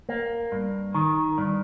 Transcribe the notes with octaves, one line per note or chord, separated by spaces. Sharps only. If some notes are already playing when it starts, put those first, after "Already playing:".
A#3
G2
D#3
G2